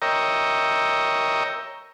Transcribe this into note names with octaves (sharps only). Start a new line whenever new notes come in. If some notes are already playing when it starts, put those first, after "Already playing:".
A#4 C#5 D#5 E5 G5 A#5